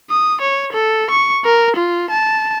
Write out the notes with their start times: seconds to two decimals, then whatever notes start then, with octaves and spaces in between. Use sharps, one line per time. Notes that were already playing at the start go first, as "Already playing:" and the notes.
0.10 D#6
0.41 C#5
0.72 A4
1.11 C#6
1.45 A#4
1.76 F4
2.10 A5